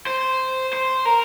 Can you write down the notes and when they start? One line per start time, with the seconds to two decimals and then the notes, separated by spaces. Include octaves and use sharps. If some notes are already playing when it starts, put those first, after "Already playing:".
0.07 C5
0.73 C5
1.05 A#4